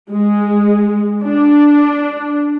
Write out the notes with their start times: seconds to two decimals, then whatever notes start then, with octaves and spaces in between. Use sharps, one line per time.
0.11 G#3
1.23 D4